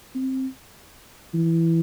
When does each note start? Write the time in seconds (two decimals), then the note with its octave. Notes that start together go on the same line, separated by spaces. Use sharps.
0.15 C4
1.34 E3